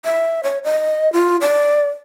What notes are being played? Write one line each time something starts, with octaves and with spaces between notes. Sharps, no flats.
E5
C#5
D#5
F4
D5